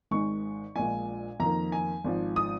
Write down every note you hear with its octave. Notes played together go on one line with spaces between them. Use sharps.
G#1 G#2 D#3 G#3 C#6
A#1 A#2 G#3 G#5
F2 D#3 A#3 A#5
G#5
G#1 G#2 F3
D#6